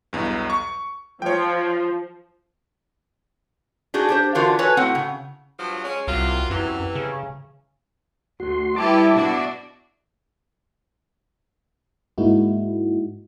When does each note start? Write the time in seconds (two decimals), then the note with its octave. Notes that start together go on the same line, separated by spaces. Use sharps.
0.13 B1 E2 G2
0.50 C#6
1.22 F3 C#5 G5
3.94 D4 D#4 F#4 G#4
4.09 D4 G4 C5
4.35 D3 E3 D4 F4 F#4 A#4
4.59 F#4 A4 B4 C#5 G#5 A5
4.77 A2 C4 F#4 F#5
4.95 C#3
5.58 G2 F3 F#3
5.84 G#3 C#4
6.07 C2 F#3 A#3 F4
6.50 F#2 C3 E3
6.95 C#3
8.40 D2 F#4 C6
8.76 G3 E4 G4 B4 A5 D6
9.15 B2 D4 F#4
12.18 G#2 G#3 A#3 D#4 E4 F#4